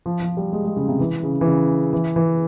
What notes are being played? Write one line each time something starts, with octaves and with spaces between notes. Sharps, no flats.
F3
F3
G3
G#3
G#3
C#3
C3
E3
C#3
E3
C#3
E3
E3